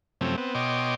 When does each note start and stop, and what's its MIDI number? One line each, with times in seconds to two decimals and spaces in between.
0.21 0.36 42
0.21 0.36 48
0.21 0.36 53
0.21 0.36 57
0.21 0.36 60
0.21 0.36 61
0.37 0.54 59
0.37 0.54 60
0.55 0.95 47
0.55 0.95 73
0.55 0.95 75
0.55 0.95 79
0.55 0.95 84
0.55 0.95 86